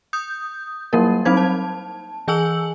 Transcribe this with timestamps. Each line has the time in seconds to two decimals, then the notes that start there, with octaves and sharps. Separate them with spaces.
0.13 D#6 G6
0.93 F#3 G3 A#3 A#4
1.25 F#3 C4 D#4 C5 G#6
1.37 A5
2.28 E3 G#4 G#5 E6 F#7